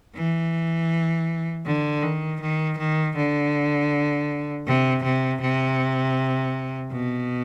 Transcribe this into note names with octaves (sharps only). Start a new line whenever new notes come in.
E3
D3
D#3
D#3
D#3
D3
C3
C3
C3
B2